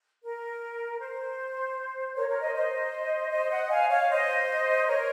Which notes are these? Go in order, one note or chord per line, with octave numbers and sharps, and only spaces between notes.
A#4
C5
A#4 C#5
A#4 C#5
C5 D#5
C5 D#5
C5 D#5
D#5 F#5
F5 G#5
C#5 F5
C5 D#5
A#4 C#5